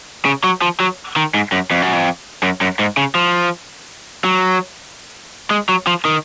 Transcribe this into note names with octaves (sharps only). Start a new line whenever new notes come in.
C#3
F#3
F3
F#3
D#3
G#2
F#2
F2
F#2
F2
F#2
F#2
G#2
C#3
F3
F#3
G#3
F#3
F3
D#3